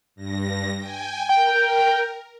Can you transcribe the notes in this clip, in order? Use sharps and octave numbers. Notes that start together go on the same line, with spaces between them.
G2 A#6
G5 G#5
A#4 G5